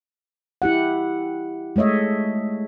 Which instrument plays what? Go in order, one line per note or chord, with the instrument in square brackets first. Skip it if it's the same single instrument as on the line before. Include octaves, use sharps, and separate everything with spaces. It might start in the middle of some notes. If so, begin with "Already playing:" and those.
[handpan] E4 G4 F#5
G#3 A3 C#5 D#5 E5